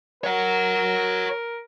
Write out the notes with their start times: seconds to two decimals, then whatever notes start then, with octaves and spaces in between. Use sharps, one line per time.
0.24 A#4 C#5 F#5